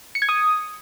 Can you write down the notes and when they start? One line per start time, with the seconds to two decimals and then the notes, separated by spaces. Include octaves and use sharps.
0.15 C#7
0.22 G#6
0.29 D#6